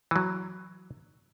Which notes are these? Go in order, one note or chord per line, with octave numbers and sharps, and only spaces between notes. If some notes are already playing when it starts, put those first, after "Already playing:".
E3 F#3